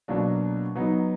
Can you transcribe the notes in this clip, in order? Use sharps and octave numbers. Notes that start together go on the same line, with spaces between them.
B2 F#3 A#3 D4
F#3 B3 D#4